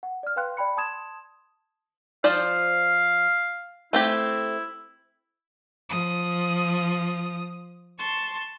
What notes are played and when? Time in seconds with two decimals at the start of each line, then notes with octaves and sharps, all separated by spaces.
0.03 F#5
0.23 D5 F6
0.36 B4 F5 G5 C6 F#6
0.57 D5 G5 B5 C#7
0.77 A5 C6 D#6 G#6 E7
2.24 F3 C5 D5 F5
3.93 A3 C4 E4 G4
5.89 F3 D#6
7.98 A5 C6 C#6